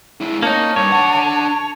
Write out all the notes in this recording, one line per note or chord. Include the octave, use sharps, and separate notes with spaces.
G#3 E4
A#3 C#4 D#4 C#5 A5
G2 C#5
D4 F#5